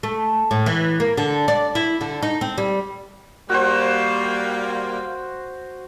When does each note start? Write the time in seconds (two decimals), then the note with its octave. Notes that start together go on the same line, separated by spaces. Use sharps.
0.03 A3
0.51 A2
0.66 E3
1.00 A#3
1.18 D3
1.48 D5
1.75 E4
2.01 D3
2.23 D#4
2.41 C4
2.58 G3
3.50 G3 A#3 F#4 C5